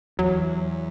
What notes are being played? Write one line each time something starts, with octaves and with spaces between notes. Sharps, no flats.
E2 F#3